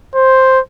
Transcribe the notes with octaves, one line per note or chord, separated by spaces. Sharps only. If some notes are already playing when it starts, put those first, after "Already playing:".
C5